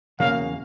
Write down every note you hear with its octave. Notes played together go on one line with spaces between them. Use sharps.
E2 C#3 F#3 A#3 F5